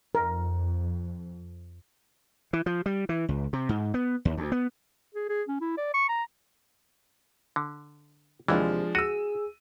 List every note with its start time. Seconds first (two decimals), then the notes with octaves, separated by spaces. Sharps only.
0.15 F2 A#4
2.53 E3
2.66 F3
2.86 G3
3.09 E3
3.29 C#2
3.53 C3
3.69 G#2
3.94 B3
4.25 D#2
4.38 D2
4.52 B3
5.15 G#4
5.29 G#4
5.48 C#4
5.61 E4
5.77 D5
5.94 C#6
6.09 A#5
7.56 D3
8.48 D#2 C3 E3 F3 G#3 D4
8.95 F#4 G#4 E6 D#7